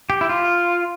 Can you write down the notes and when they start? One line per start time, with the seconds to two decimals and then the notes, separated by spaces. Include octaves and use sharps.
0.10 G4
0.21 E4
0.29 F4